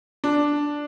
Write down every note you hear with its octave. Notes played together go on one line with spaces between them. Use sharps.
D4